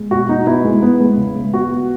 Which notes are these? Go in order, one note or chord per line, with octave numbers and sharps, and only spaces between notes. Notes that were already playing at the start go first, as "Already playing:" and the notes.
Already playing: G#3
B2 F#4
B2 D#4
B3 E4
G#3
B3
G#3
C#3
G#3
B3 F#4
B3